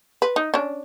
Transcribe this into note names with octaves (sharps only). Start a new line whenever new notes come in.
B4
D#4
C#4 D4